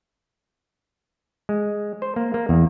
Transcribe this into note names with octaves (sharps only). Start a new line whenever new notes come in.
G#3
C5
A#3
A#3
E2